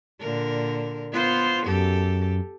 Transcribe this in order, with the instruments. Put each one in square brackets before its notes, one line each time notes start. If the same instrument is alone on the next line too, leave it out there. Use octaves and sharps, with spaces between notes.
[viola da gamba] A#2 D3 A#4
B3 F4 C5
[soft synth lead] F#2 [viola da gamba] G4 A4